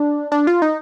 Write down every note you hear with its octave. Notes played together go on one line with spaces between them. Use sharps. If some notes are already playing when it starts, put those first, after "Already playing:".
Already playing: D4
D4
F4
D#4